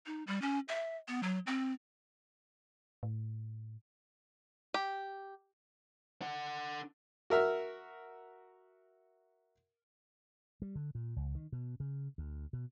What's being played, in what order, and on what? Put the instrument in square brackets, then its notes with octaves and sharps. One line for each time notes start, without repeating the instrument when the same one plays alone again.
[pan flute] D#4
G3
C#4
E5
B3
F#3
C4
[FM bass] A2
[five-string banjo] G4
[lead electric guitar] D4 F#5
[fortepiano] F#4 A#4 E5 F6
[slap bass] G3
D3
A#2
C#2
D#3
B2
C#3
D2
B2